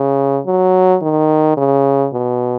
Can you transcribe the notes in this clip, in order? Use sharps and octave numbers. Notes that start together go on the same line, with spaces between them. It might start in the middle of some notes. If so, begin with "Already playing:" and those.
Already playing: C#3
F#3
D#3
C#3
B2